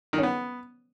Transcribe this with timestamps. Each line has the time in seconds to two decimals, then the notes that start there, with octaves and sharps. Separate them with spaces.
0.13 D#3
0.18 C#4
0.23 B3